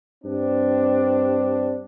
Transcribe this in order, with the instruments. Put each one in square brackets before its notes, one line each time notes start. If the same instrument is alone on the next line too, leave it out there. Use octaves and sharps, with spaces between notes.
[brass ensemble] G2 C4 D4